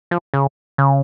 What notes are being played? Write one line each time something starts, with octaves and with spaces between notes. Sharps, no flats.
F3
C#3
C#3